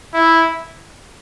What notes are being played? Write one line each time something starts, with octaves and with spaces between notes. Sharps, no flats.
E4